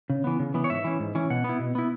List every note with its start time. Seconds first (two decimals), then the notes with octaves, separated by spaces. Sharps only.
0.10 C#3
0.24 E3 B3
0.39 C#3
0.54 E3 B3
0.64 C#5
0.70 G#2 E5
0.84 E3 C#4
1.00 G#2
1.15 E3 C#4
1.30 B2 F#5
1.44 B3 E4
1.59 B2
1.75 B3 E4